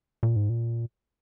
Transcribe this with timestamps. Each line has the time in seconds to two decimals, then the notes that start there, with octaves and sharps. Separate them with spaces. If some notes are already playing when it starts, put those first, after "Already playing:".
0.23 A#2
0.36 G#2
0.49 A#2